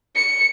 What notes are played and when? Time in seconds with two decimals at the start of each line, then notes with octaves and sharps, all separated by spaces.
0.16 C#7